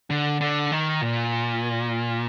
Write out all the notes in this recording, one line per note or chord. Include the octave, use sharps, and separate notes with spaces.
D3
D3
D#3
A#2